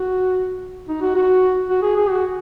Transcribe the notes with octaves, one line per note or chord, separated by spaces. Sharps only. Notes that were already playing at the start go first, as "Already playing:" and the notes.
Already playing: F#4
D#4
F#4
F#4
F#4
G#4
G#4
F#4